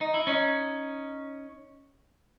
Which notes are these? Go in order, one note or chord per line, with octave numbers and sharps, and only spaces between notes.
D#4
E4
C#4 D#4